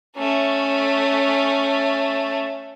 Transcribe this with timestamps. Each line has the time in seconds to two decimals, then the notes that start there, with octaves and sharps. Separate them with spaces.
0.16 A3 C#4